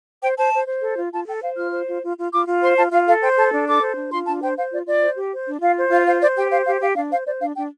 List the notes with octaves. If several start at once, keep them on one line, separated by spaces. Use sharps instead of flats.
C5 G5
C5 A5
C5
C5
A4
F4
F4 A5
A4 G5
C5 F5
F4 F6
C5
F4
F4
F4
F4 D6
F4
C5 C6
F4 A5
F4 F5
A4 F5
C5 G5
A4 A5
D4
A4 D6
C5
D4
F4 C6
D4 A5
C5 G5
C5 F5
F4 D5
F4 D5
C5
G4
C5
D4
F4 F5
C5
F4 F5
C5 F5
C5 D5
G4 G5
C5 F5
G4 F5
G4 F5
D4 F5
C5 F5
C5 D5
D4 F5
D4 G5